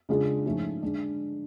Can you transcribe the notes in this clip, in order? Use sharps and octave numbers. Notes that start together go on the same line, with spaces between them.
C#3 G#3 D4 F4 G#4
G#2 F3 A3 C#4
D3 G#3 D4